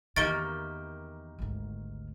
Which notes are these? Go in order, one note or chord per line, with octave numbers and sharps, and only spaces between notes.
E2 D#3 A#3 G4 A6 D7 G7
G#1 D2